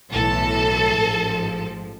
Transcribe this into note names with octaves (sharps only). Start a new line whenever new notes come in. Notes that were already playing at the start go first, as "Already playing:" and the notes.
B1 A2 E3 A4
A1 G#2 F3